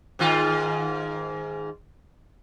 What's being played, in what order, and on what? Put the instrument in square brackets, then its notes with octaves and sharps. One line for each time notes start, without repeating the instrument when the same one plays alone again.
[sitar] G#2 D#3 F4